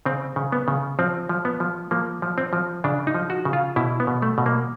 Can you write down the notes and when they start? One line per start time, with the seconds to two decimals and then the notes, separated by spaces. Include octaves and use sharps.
0.05 C#3 C4
0.36 C#3
0.52 B3
0.68 C#3
0.99 F3 C4
1.29 F3
1.45 B3
1.60 F3
1.91 F3 A#3
2.22 F3
2.38 C4
2.53 F3
2.84 C#3 D4
3.07 D#4
3.14 F3
3.30 F#4
3.45 C#3
3.53 F4
3.76 B2 E4
4.00 B3
4.07 B2
4.22 A3
4.38 B2
4.46 A#3